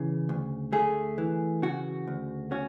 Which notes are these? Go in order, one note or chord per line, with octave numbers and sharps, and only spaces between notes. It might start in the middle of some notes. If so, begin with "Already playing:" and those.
Already playing: C#3 E3
D2
A3 G#4
E3
C#3 F#4
D2
C#4 F#4